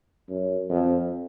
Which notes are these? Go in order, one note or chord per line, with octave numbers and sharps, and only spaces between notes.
F#2
F2